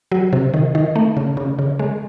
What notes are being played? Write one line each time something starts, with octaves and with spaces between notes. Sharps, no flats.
F#3
C3
D#3
D#3
A3
C#3
C#3
C#3
G#3